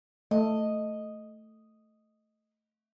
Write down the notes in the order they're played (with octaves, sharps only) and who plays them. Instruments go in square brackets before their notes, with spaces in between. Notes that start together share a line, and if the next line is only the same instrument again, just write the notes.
[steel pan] A3 [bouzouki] D#5